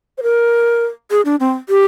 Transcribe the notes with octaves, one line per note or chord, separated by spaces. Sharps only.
C5
A#4
G#4
D4
C4
G4